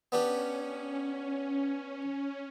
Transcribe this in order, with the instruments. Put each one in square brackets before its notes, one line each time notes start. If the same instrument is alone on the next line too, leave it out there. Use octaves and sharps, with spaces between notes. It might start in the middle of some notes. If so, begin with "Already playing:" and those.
[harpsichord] B3 D4 G4 [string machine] C#4